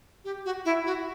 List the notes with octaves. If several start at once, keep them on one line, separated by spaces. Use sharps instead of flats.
G4
F#4
E4
F#4